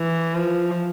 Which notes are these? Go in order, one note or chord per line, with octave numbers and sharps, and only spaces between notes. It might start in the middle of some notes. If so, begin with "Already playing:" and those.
Already playing: E3
F3